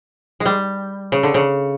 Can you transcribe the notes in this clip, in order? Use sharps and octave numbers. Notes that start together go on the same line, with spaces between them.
G#3
G3
C#3
D3
C#3